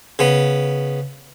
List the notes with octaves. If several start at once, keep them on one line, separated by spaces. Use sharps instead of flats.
C#3 B3